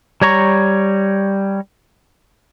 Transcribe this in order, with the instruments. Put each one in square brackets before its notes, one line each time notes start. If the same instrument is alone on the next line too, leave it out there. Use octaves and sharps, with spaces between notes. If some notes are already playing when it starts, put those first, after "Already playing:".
[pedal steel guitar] G3 C#5 A#5 C#6